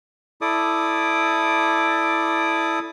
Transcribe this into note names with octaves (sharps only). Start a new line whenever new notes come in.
E4 A4 D5 D6 D#6